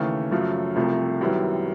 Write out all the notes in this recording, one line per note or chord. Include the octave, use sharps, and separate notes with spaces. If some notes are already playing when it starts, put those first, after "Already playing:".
Already playing: D#2 C#3 E3 A3
F#2 C#3 F3 A3
C2 C3 F3 A3
F#2 D#3 G3 B3 E4